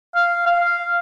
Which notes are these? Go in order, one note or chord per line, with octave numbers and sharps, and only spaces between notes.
F5
F5